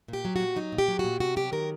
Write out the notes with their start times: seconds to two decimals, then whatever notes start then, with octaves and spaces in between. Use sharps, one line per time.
0.08 A#2 G4
0.25 F#3
0.36 A#2 F#4
0.56 F#3 D#4
0.72 A#2
0.78 G4
0.88 F#3
0.99 A#2 F#4
1.20 C3 F#4
1.36 F#3 G4
1.52 D#3 A#4